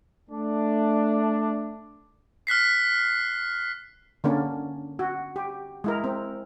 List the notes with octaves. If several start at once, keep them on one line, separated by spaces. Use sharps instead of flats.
A3 D4
F6 F#6 B6 C7
D3 A#3 C#4 D4
F#4
G4
G#3 E4 A#4
C4